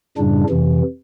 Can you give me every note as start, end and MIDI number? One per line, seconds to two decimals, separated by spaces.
0.18 0.44 42
0.18 0.44 45
0.18 0.44 49
0.18 0.44 55
0.18 0.44 62
0.50 0.82 41
0.50 0.82 48
0.50 0.82 52